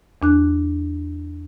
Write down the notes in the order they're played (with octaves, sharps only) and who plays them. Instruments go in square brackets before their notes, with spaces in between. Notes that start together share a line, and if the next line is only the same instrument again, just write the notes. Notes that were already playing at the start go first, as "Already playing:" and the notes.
[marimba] E2 D4 F#6